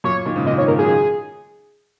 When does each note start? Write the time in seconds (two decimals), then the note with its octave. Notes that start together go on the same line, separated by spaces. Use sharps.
0.04 F#2 A#2 C#5
0.25 A#2 D#3
0.36 G#2 C#3
0.46 A#2 D#3 D#5
0.57 G#2 C#3 C#5
0.68 A#2 D#3 A#4
0.79 C#3 F#3 G#4